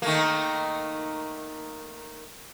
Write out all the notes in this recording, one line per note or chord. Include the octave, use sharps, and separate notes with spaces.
D#3 A3 A#3